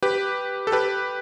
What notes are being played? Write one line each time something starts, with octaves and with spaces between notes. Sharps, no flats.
G4 B4
A4
G4 B4